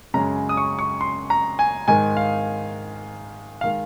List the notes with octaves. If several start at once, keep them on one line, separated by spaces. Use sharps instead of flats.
F#2 C#3 G#3 A#5
D#6
C#6
C#6
C6
A#5
G#5
G#2 D#3 G#3 G#5
F5
D#3 G#3 F5